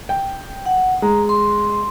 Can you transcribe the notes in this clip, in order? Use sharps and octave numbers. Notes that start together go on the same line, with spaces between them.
G5
F#5
G#3 A#5
C6